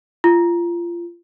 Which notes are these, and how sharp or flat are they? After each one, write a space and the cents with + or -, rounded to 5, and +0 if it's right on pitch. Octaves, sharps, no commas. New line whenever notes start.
F4 -25